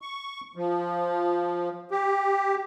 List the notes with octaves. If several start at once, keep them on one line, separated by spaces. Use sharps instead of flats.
C#6
F3
G4